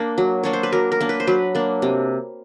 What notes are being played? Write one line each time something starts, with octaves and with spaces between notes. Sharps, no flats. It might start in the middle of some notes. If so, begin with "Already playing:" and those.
Already playing: A#3 D4
F#3
A#3 D4 C#5
C5
B4
F#3 A#4
A#4
A#3 D4
B4
C5
F#3 B4
A#3 D4
C3